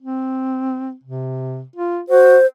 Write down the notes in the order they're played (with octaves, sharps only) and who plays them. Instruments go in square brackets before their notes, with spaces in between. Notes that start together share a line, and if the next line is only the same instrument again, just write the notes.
[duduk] C4
C3
F4
[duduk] F#4 [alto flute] C5